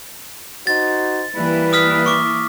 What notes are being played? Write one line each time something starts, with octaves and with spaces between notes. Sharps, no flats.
D#4 F#4 C5 A6
E3 G3 A#3 E4 B4
D#6 F6 B6
C#6 D6